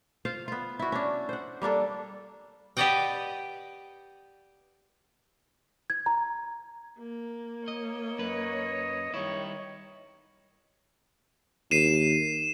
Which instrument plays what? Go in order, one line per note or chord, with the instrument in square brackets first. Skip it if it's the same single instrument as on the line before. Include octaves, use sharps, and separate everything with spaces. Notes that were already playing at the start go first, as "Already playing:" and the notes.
[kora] F4 C5 F5
B3 F4
E4 F#4
C#4 D4
C5 F#5
G3 A#3 D4 A4
[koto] G4 B4 D5 D#5 F#5 G5
[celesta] G#6
A#5
[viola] A#3
[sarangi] C#5 [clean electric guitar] D#5
[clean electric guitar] F#2 B4 [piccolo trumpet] D#5
[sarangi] D#3 [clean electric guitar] G3 E4 [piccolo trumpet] C#5
[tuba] D#2 [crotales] C7 D#7 E7